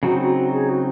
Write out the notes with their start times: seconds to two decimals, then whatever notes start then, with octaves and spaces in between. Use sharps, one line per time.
0.03 C#3 F#3 C4 D#4 F#4
0.20 F#4
0.36 F#4
0.52 G#4
0.69 F#4